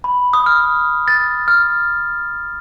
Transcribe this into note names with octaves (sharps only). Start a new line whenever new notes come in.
B5
D#6
F6
A6
F6